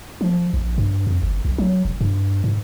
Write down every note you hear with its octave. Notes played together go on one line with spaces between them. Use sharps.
F3
A#1
G2
F2
G1
B1
F#3
E1
G2
G#2